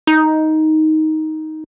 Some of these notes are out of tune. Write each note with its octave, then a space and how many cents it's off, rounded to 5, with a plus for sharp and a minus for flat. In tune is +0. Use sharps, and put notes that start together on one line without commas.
D#4 +10